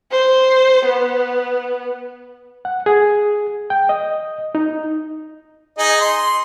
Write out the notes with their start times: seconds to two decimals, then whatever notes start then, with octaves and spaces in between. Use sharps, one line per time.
0.11 C5
0.85 B3
2.65 F#5
2.86 G#4
3.70 G5
3.89 D#5
4.55 D#4
5.78 D#4 G#4 D#5
6.01 C6